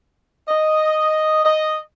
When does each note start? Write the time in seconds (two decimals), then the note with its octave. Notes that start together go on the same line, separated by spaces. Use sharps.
0.48 D#5
1.45 D#5